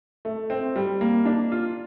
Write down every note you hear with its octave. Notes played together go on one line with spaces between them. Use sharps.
A3
C4
G3
A#3
D4
F4